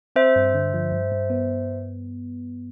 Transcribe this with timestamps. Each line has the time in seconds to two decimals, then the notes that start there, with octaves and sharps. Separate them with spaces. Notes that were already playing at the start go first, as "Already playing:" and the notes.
0.16 C4 C5 E5
0.36 G2
0.54 D3
0.74 F3
0.92 G2
1.12 G2
1.30 B3